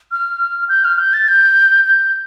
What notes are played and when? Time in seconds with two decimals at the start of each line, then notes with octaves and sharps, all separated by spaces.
0.11 F6
0.69 G6
0.84 F6
0.98 G6
1.13 A6
1.28 G6
1.86 G6